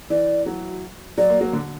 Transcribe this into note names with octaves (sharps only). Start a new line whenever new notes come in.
E3 D5
F#3
F#3 D5
A#3
F#3
D3